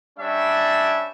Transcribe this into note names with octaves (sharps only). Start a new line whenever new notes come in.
G3 C#4 D4 E5